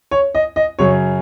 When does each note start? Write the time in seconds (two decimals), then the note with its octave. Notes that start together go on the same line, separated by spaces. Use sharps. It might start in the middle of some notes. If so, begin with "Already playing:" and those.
0.11 C#5
0.35 D#5
0.56 D#5
0.79 F#2 C#3 F#3 C#5